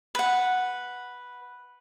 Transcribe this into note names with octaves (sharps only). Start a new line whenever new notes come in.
B4 F#5